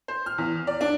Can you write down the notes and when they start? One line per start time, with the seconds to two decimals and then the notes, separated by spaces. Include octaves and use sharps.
0.08 C5
0.26 F6
0.38 E2
0.67 D5
0.81 D4